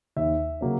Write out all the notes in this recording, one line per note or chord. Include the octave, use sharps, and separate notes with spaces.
D#2 E5
C#3 F#3 A#3 C#4